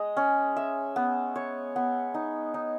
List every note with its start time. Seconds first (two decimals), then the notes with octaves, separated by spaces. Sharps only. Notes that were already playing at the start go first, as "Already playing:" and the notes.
Already playing: G#3 D#5
0.17 C#4
0.56 E5
0.96 B3
1.36 C#5
1.76 B3
2.14 D#4
2.54 D#4